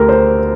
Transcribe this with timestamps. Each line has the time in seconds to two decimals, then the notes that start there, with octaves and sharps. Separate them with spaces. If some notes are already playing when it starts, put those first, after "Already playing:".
Already playing: D2 A3 G4 A4 A#4
0.09 C5